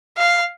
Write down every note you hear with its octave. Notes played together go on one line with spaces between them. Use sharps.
F5